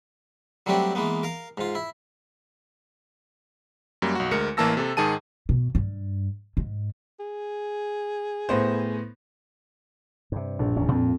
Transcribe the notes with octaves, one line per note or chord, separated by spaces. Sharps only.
F#3 G3 A3 C4 D4 G4
E3 G#3 A#3 B3
A#4 F5
G#2 F4
E4
F#2 G3 A#3
B1 F#4
D2 G#3 A#4 C#7
A1 E3 A#3 A5 E6 A#6
C3 A4
G#2 D#3 G#4 A5 D#7
B2
G2
G#2
G#4
A2 B3 C5
G2 C3
A#1
D1 E2 C#4
F2 A2